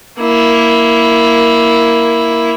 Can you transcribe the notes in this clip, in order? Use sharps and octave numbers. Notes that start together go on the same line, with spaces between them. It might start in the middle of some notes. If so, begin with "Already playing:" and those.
A#3 E4